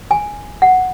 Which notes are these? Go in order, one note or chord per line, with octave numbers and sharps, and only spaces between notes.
G#5
F#5